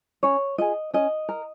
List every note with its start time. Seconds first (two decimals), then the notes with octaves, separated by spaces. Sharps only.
0.23 C#4 C#5
0.58 F4 G#4 D#5
0.94 C#4 D#5
1.29 A#4